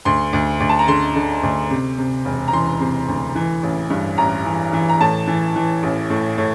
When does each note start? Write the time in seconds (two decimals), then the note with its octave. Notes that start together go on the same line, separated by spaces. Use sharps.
0.05 D2 C6
0.33 D2
0.60 D2
0.69 A5
0.79 A#5
0.88 D3 C6
1.16 D3
1.43 D2
1.71 C3
1.98 C3
2.25 E1
2.48 A#5
2.53 E3 C6
2.80 C3
3.08 D2
3.35 E3
3.63 A1
3.90 G2
4.18 A1 A#5
4.46 E3
4.73 E3
4.89 A#5
5.01 A2 A5
5.28 E3
5.56 E3
5.83 A1
6.10 A2
6.38 A2